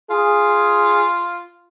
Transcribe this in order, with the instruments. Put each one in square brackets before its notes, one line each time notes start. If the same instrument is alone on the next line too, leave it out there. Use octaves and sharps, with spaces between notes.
[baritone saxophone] F4 [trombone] G#4